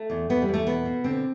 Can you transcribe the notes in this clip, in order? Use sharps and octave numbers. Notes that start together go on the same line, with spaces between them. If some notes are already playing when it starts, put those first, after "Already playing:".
Already playing: A3
E2
E2 B3
G3
E2
A3
B2 B3
B2
D3 C4